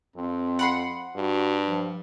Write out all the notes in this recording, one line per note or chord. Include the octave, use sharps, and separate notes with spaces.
F2 C4
F#5 B5 C6
G2 F#4
F3